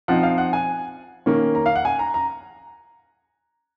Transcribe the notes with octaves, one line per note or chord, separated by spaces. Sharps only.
F3 C4 D#4 F#5
F5
F#5
G#5
D#3 A#3 C#4
A#5
F5
F#5
G#5
A#5
A#5